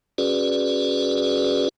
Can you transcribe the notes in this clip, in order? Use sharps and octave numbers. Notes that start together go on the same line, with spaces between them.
C#4 F#4 G#4 B4 D5